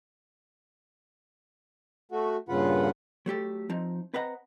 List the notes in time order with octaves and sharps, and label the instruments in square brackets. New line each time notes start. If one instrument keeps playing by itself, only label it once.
[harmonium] A3 F#4
G2 A#2 C#3 F4 B4 F#5
[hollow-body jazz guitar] F#3 A3 G4 A4
F3 C4 D#4
C4 B4 D#5 F#5 A#5